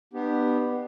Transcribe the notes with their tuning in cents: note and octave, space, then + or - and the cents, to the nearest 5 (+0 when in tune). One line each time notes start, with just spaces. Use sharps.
B3 +0 D4 +40 G4 +0